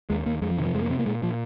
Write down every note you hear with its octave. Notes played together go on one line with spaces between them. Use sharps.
D#2 G#3
D#2 A#3
F2 G#3
F3
C3 D#3
F3
F2 G#3
A#3
C3 C4
A#3
A#2 G#3
A#2 F3